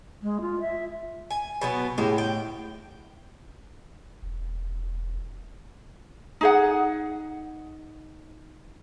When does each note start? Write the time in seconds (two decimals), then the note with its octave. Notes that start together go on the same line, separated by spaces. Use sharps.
0.22 G#3
0.41 F4
0.60 E5
1.30 G#5
1.61 B2 F#3 B3
1.98 A2 G#3 F#4 G4
2.18 G5
4.22 E1
6.41 D#4 G#4 F#5